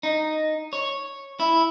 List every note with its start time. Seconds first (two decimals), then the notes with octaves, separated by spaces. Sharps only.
0.03 D#4
0.73 C#5
1.40 E4